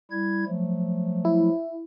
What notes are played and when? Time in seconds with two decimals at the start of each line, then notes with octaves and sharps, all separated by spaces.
0.11 G3 E4 G#6
0.47 F3 F#3 A3
1.25 E4